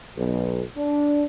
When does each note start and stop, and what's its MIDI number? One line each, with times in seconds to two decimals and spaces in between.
0.16 0.62 35
0.76 1.25 62